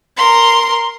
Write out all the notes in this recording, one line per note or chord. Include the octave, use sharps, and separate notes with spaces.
A#4 C6